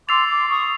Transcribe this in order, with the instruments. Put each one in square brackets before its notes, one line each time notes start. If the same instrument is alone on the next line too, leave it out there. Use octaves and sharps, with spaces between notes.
[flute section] C6 D6 [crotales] E6 A6 C7 F7
[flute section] C6 D6
C#6 D#6